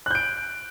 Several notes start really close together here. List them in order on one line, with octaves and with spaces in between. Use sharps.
F#6 G6 D7